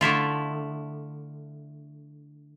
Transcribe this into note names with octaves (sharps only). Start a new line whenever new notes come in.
D3 A3 E4 F4